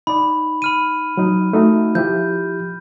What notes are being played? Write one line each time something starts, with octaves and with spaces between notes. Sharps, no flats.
D#4 D5 B5
B5 F6 D#7
F#3 D#4
A3 D#4 F#4
F3 E4 G4 G6